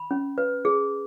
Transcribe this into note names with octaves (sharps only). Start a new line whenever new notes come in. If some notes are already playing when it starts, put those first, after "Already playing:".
Already playing: B5
C#4
B4
G#4